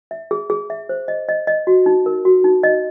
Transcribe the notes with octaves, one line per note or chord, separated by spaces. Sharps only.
E5
G#4
G#4
E5
C5
D#5
D#5
D#5
F#4
D#4
A#4
F#4
D#4
D#5